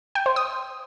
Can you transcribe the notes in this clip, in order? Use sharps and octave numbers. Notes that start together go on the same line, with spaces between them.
G5
C5
D#6